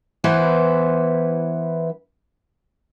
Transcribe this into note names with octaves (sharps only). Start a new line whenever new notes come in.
E3 B3 E4 B4 C5